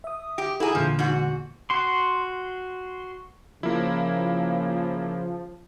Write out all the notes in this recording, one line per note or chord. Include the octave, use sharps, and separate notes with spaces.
E5 D#6
G4
E4 G#4 A4 F#5 A#5
E2 A#2 D3 F3
G#2 F#4
F#4 C6
C#3 F3 A#3 E4